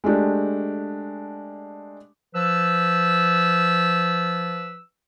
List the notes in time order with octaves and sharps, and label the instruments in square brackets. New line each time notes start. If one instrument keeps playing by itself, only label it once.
[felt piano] G#3 A3 D4 G4
[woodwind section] F3 B4 E6